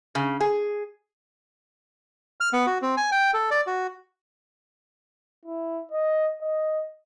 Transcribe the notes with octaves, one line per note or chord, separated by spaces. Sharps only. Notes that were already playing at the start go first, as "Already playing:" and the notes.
C#3
G#4
F6
B3
F#4
C4
G#5
G5
A4
D5
F#4
E4
D#5
D#5